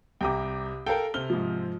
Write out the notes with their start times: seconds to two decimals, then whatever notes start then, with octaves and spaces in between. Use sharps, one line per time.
0.21 C2 C3 G5 A#5 D6
0.86 A4 A#4 F5 G5
1.14 C3 F6 G7
1.30 G#2 F3